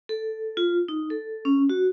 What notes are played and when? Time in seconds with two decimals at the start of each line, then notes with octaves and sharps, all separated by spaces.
0.09 A4
0.57 F4
0.88 D#4
1.10 A4
1.45 C#4
1.69 F#4